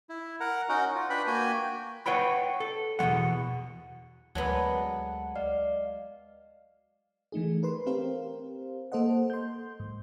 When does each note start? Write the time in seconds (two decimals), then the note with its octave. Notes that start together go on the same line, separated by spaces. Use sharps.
0.09 E4
0.40 A#4 F#5 A#5
0.69 C#4 D#4 F#4 A#4 D#5 F#5
0.95 F4
1.10 D4 B4 G5 B5
1.27 A#3 F#4 G5 G#5
2.06 B4 C#5 F#5 G5 B5
2.60 A4
2.99 E2 B2 F3 G#3 F#5
4.35 D2 F#3 G#3 B3 F#5 A5
5.36 D5 D#5 F5
7.32 E3 A3 D#4 G#4
7.63 A#4 B4 C6
7.86 C4 G4 A#4 C5 F5
8.92 A#3 A4 C5 D#5 F#5
9.30 C6 G6
9.80 G#2